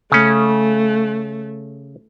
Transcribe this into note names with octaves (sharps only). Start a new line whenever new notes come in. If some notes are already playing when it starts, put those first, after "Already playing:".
C#3 A3 C#4